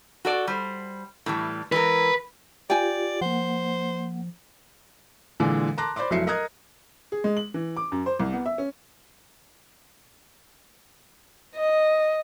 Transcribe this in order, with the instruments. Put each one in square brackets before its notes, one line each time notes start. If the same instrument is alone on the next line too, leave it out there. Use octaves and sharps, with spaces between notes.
[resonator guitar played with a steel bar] F#4 A4 D5
G3 C5
A2 E3 G3
[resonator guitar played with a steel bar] E3 G#3 A#4 [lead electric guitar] B4
[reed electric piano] F4 G4 [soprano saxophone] D5 [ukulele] G5 G#5
[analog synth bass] F3 [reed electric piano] A#3 F#5 [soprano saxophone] C5
[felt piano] A#2 D3 E3 G#3
A5 A#5 C6 D6 F#6 A#6
C5 D5 B5 C6 D6
F1 F#3 E4 E5 C7 C#7
A#4 D#5 A#5 D#6 F#6 G#6
[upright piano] G#4
G#3
F#7
E3
D6
F#2
C5
C2
B3
E5
C#4
[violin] D#5